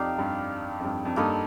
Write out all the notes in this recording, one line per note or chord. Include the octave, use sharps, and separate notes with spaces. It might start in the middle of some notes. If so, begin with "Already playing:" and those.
Already playing: F2 D#4 G4 D5 F5
G2
F2
G2
F2
G2 A#3 D#4 A4 D#5